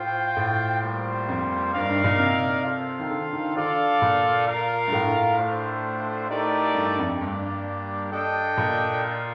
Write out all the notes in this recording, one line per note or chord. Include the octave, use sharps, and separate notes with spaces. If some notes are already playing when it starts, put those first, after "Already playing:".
Already playing: A2 F4 C5 G5
A2
G3 A#3 F4 C5
F2
G2 D#4 A#4 D5 F5
G2
A#2
C3
F4 A4 C5 F5
D#3
D3
D#3
D3 F4 A4 D5 F5
A#2
F4 A#4 F5
G2
A2
A3 D4 F4 C5
A3 D#4 G4 A#4 D5
G2
F2
G2 G3 A#3 D4 G4
D4 A4 D#5 G5
A#2
F4